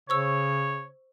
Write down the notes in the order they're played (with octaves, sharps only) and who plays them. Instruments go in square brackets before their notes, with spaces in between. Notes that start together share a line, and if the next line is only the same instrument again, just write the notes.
[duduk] C#3 [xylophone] C5 C#6 E6 [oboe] C#5